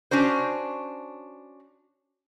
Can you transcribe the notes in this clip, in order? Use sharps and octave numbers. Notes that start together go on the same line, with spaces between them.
C#4 D4 F#4 C5